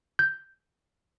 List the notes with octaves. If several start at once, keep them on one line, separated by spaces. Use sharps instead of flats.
G6